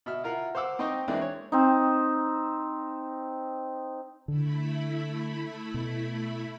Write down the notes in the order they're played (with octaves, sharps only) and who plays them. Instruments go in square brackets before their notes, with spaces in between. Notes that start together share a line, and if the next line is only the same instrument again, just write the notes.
[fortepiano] B2 E5 F6
E4 F4 A#4 F5 F#5
C5 F5 F#5 D6 E6
C4 D#4 C5 D#5 G5 C#6
E3 G#3 A#3 C4 D4 E4
C#5
[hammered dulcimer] C4 D#4
[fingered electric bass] D3 [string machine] A3 E4 B5
[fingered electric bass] B2